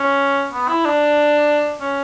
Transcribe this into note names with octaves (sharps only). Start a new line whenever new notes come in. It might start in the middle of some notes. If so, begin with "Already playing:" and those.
Already playing: C#4
B3
E4
D4
C#4